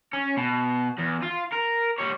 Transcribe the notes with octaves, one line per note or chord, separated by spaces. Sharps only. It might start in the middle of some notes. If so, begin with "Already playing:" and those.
C#4
B2
E2
F4
A#4
G3 C#5